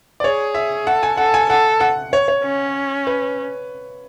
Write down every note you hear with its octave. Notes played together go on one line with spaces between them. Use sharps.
D5
G#4 C#5
E5
A4 F#5
G#5
A4 F#5
G#5
A4 F#5
F#5
C#5
C#5
C#4
B4